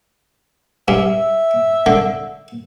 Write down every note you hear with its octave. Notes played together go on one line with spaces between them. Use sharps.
G2 E5
D3